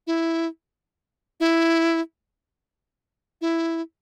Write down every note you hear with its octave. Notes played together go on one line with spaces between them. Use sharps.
E4
E4
E4